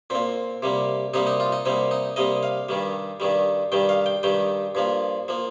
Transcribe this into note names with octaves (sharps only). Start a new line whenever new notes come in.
A#2 A#3 C4
C3 G3 A#3
C3 G3 A#3 D#4
D#4
F4
D#4
C3 G3 A#3 C4
D#4
C3 G3 A#3 D#5
F5
G2 D#3 G3
G2 D#3 G3
G2 D#3 G3 G5
F5
G5
G2 D#3 G3 G5
G2 F3 A#3
F3 A#3